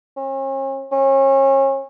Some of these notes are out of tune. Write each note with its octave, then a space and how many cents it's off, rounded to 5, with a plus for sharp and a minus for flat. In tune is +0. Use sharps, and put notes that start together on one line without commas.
C#4 -40
C#4 -35